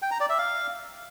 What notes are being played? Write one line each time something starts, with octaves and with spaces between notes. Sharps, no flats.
G5
A#5
D5
E5
F5